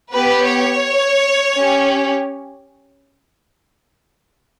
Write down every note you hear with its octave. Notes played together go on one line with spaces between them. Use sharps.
B3 G4 B4
C#5
C#4 G4